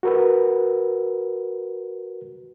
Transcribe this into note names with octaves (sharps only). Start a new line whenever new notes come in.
F#4 A#4 B4